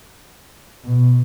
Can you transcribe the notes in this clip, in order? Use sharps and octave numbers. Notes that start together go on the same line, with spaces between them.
B2